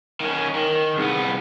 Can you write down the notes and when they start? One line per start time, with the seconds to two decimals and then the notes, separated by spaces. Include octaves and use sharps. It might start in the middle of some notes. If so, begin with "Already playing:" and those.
0.21 D#3 C#4 A#4
0.55 D#3
0.97 C2 B3 G#4